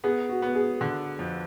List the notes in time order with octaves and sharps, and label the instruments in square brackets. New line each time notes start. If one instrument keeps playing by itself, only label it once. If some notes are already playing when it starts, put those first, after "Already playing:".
[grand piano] B3 [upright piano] G#4
[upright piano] F#4
[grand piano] B3
[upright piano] G#4
[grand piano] D3
F2